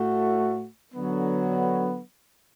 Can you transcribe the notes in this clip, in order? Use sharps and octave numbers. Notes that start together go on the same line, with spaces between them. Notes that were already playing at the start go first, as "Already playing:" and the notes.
Already playing: A2 A3 F#4
D3 F#3 B3